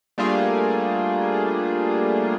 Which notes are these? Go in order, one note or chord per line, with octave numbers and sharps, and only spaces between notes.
G3 A3 A#3 D4 F4 G#4